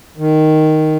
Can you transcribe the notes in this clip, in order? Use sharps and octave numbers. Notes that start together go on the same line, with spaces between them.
D#3